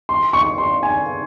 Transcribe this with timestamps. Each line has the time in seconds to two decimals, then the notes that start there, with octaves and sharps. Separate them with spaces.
0.09 C6
0.33 C#6
0.58 C6
0.83 G#5